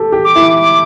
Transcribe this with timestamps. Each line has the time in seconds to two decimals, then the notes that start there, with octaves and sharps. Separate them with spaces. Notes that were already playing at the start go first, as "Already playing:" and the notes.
Already playing: G4 A4
0.12 G4
0.24 D6
0.36 E4
0.59 D6